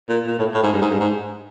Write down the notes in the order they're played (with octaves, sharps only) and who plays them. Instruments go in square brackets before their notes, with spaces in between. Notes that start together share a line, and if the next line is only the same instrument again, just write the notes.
[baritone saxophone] A#2
A#2
A2
A2
G#2
G2
G#2
G2
G#2